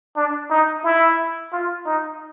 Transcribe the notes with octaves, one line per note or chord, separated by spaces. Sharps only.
D4
D#4
E4
F4
D#4